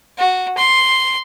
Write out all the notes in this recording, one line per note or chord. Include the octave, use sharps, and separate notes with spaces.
F#4
C6